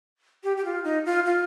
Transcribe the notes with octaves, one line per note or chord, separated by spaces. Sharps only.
G4
G4
F4
D#4
F4
F4